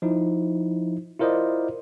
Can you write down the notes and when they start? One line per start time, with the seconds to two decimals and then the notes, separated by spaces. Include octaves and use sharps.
0.02 F3 D#4 E4
1.19 E4 F4 A#4 C5 D5 D#5